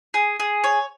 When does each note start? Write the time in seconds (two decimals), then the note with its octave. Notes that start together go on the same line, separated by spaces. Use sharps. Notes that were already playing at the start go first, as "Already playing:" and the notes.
0.14 G#4
0.40 G#4
0.64 C#5